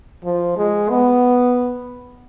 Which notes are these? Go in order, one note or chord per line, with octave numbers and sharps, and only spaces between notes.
F3
G#3
B3